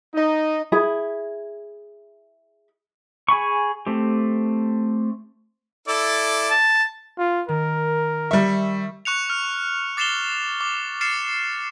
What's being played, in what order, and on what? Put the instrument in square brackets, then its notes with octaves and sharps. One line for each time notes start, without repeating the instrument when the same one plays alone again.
[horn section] D#4
[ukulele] E4 G#4 B5
[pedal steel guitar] G#4 G#5 B5 C#6
A3 C4 G4
[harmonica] E4 A4 D5
[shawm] A5
[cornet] F4
[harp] D#3 [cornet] A#4
[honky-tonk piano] G3 E5 [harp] C#6
[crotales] C#6 F#6 C#7 F7
F6
D6 A6 C7 E7 F7 G7
D6
F6 A6 C7 C#7 E7